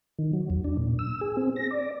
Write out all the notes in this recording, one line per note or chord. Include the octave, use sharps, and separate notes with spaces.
D#3
F#3
E2
D4
A#2
E6
G#4
C4
A#6
D5